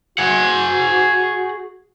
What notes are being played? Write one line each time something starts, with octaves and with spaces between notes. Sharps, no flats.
F#4 G#4 F#5